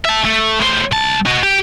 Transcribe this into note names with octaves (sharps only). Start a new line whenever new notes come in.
E5 A5
A3
A2 C5
C2 A5
F#4 D#5
G4